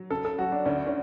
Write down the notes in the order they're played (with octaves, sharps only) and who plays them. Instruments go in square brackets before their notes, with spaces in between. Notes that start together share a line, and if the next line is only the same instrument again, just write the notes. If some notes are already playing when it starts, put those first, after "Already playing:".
Already playing: [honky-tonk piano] F#3
[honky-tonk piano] C#3 [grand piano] A4
[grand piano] A4
[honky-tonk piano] F#3 [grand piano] F#4
[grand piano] D4
[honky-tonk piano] D2 [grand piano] C#4
[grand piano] C#4